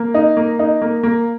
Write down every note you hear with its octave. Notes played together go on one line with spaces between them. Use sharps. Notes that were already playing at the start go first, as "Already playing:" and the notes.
Already playing: A#3
D#4
A#3
D#4
A#3
A#3